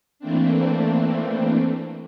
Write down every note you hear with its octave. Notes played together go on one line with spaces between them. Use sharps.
E3 A3 A#3 C4 D4